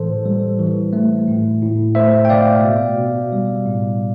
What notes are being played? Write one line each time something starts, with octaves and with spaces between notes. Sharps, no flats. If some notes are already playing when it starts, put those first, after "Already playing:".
Already playing: A2 E3 A4 C5
G3
E3
A3
A2
A2
A3 C5 E5
G5
B2 D5 F5
B2
B2
G3
A2